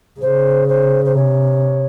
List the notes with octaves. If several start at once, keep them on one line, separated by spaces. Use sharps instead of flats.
C#3 C5
C5
C5
C3 C#5